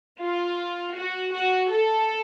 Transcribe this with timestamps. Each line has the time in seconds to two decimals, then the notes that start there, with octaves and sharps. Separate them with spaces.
0.21 F4
0.96 F#4
1.34 F#4
1.72 A4